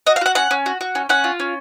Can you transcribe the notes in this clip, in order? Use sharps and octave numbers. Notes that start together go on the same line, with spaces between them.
F#4 D#5
F5
F#4 F#5
C#4 F#5
C#4
F#4
F#4
C#4
C#4 F#5
F4
C#4